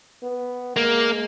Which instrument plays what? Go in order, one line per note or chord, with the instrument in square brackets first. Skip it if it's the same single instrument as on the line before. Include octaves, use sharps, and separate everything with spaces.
[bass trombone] B3
[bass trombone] G#3 [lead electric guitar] A#3